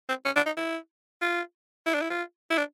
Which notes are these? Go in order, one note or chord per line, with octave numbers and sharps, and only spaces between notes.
C4
C#4
D4
D#4
E4
F4
E4
D4
E4
F4
E4
D4